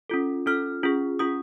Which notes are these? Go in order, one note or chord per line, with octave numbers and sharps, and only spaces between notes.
C#4 F4 A4
C#4 F4 A4 F6
C#4 F4 G#4
C#4 F4 G#4 D#6